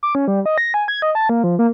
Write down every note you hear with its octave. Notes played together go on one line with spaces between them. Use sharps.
D6
C#4
G3
D#5
A#6
G#5
G#6
D#5
A5
A#3
F3
A#3